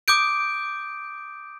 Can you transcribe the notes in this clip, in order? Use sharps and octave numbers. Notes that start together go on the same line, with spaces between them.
D6 D#6 G6 D7